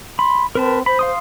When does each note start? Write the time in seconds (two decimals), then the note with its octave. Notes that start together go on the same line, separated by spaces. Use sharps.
0.19 B5 C6
0.55 C4 A#4 B4 A5
0.86 C5 B5
0.99 F5 C6 D#6